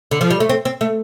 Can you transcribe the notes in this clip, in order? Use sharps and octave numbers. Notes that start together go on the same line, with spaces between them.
D3
F3
G3
A3
C4
C4
A3